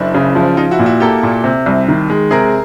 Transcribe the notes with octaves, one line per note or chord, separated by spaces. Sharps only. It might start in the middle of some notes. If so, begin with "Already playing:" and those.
Already playing: F#1 D4 E4
C#3
F3
F3 D#4 F4
E4 F#4
A#2
E4 F#4
A#3 G4 A4
A#2
C3
C2
D#3
G#3
C3 G#4 A#4